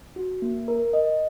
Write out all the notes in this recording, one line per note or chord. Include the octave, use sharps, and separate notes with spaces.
F#4
A#3
A#4
D#5